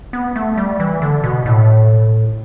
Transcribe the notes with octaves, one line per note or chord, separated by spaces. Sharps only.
B3
A3
G3
E3
D3
B2
A2